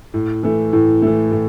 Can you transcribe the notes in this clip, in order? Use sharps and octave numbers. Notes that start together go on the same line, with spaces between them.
A2
E3 A3
A2
E3 A3
A2